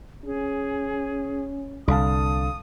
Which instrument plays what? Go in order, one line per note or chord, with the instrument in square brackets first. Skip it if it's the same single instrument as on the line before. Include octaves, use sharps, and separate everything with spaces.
[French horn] C#4 [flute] G#4
[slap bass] C2 [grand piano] D3 F5 A5 [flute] D#6